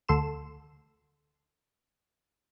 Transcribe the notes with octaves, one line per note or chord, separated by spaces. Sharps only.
D2 A4 C6 E7